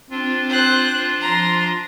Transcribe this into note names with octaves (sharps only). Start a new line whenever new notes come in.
C4 D4 F4
C5 F#6
F3 A#5 C6